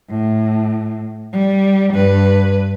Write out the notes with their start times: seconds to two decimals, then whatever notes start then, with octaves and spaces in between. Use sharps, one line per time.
0.10 A2
1.33 G3
1.94 G2 B4